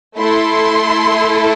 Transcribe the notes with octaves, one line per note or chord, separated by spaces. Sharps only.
A3 E4 A4 C6